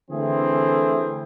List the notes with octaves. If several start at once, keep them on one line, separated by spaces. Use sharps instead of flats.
D3 E3 A3 C4 G#4